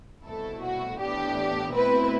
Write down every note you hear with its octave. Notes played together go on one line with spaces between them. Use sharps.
C2 B2 A3 E4 A4
F#4
A2 E3 B3 D4 G4
B2 A3 C4 E4 B4